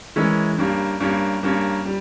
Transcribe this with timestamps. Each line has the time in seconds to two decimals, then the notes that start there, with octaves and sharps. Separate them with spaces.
0.16 E3 G#3 C#4 E4 A#4
0.58 G2 G3 A#3 C#4
1.00 G2 G3 A#3 C#4
1.43 G2 G3 A#3 C#4
1.85 G3